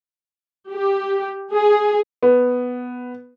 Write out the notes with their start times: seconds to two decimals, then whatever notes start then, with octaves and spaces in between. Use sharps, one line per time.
0.71 G4
1.51 G#4
2.23 B3